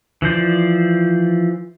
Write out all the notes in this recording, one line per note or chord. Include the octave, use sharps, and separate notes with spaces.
E3 F3 C5 D5